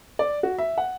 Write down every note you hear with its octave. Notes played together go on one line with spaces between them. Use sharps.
D5
F#4
E5
F#5